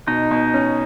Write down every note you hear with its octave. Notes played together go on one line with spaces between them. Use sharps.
B2 D#4
B2
C#4